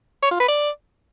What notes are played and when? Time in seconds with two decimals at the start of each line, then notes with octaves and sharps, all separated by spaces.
0.23 C#5
0.31 F4
0.40 B4
0.49 D5